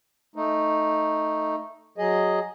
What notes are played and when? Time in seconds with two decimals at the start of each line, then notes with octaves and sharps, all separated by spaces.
0.36 A3 D#4
1.98 F#3 G#4 D#5